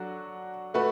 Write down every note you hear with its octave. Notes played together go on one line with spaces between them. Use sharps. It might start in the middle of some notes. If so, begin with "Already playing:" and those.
Already playing: F#3 D4 F#4 A4
A3 F#4 B4